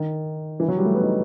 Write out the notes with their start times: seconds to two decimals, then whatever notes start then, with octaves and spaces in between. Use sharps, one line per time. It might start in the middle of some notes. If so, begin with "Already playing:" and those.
Already playing: D#3
0.60 E3
0.68 F#3
0.77 G3
0.85 A3
0.94 B3
1.03 D#4